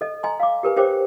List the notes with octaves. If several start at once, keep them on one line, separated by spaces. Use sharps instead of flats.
A4 D#5
D#5 G#5 A#5 C6
F5 D6
G4 A#4 B4 G#5
G4 A#4 C5 C#5 G5 D6